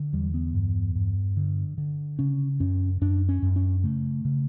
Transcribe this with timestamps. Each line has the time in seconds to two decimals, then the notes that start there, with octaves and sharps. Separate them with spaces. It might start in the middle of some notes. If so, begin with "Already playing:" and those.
Already playing: D3
0.13 E2 G3
0.34 B3
0.54 G2
0.95 G2
1.37 D3
1.78 D3
2.19 C#3 C#4
2.60 F#2 C#4
3.01 F#2 D4
3.29 C#4
3.42 F#2
3.56 C#4
3.84 C#3 A3
4.25 C#3